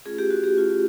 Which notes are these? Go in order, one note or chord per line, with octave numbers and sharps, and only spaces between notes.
A3 C#4 F4 G#4
G4
F#4
G4
A3 C#4 F4